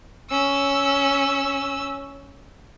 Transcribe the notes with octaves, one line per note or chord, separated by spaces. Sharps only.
C#4 E6